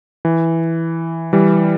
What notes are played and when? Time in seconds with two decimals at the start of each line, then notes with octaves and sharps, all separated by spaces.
0.25 E3
1.33 E3 G3